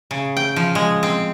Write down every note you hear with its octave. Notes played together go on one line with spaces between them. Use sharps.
C#3
G5
F3
G#3
C4